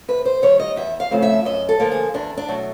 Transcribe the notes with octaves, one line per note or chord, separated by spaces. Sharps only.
C3 B4
C5
D#3 G3 C#5
D#5
E2 E5
F5
C#3 F3 A3 C4
E5
F#2 D#5
A4
D3 F3 A#3
G#4
E2 D4
D4
B2 F#3 A3